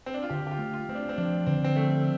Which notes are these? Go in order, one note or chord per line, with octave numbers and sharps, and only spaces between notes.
C4
D4
F4
D3 G4
G4
F4
A3
F4
A3 C4
D4
C4
F3 D4
D3 C4
C4
F3 A3